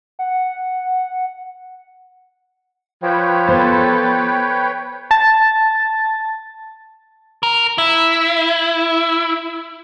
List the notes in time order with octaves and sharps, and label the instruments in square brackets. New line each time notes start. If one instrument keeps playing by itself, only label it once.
[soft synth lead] F#5
[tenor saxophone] F3 [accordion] B4 C#5 G5
[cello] B3 A4 [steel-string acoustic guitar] C5
[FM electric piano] A5 A6
[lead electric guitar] A#4
E4